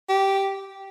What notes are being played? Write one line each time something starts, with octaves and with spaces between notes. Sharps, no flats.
G4